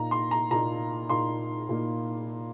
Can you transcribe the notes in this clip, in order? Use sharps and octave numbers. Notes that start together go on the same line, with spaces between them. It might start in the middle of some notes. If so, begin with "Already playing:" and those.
Already playing: A#2 A#3 D#4 A#5
C6
A#5
A#2 A#3 D#4 A#5
A#2 A#3 D#4 C6
A#2 A#3 D#4